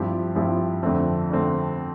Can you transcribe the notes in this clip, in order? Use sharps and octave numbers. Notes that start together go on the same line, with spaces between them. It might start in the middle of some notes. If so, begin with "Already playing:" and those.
Already playing: G2 F3 C4 E4 G4
G2 F3 C4 E4 G4
F2 D3 A3 C4
D3 A3 C4